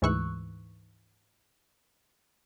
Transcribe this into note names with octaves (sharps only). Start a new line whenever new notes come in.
D2 G#2 E3 C#6 E6 F#6